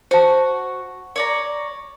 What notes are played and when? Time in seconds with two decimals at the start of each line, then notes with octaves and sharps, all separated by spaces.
0.11 F#4 C5 A5
1.16 C#5 D5 A#5